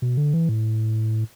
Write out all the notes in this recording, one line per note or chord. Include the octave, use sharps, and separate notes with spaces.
B2
D3
E3
A2